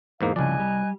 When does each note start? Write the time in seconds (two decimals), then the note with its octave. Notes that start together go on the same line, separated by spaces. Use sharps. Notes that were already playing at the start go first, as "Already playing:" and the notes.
0.21 E2 G#2 A#3 F5
0.36 C2 C#3 F3 D5 D#5 G#5 F#6
0.60 G3